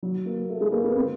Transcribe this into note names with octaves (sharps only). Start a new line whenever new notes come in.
F#3
A#3
A3
G#3
A#3
B3
C4